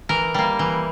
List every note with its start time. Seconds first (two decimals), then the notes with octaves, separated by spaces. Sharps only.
0.09 E3 A#4
0.34 G3 A#3
0.59 E3